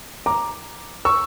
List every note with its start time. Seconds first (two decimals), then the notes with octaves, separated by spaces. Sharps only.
0.26 A#5 D6
1.05 C#6 E6